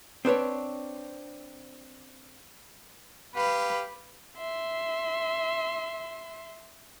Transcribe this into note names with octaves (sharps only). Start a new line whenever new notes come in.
C4 D4 B4 C#5
G4 B4 F5
E5 C6